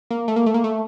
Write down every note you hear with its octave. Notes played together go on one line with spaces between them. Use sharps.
A#3
A3
A#3
A3
A#3
A3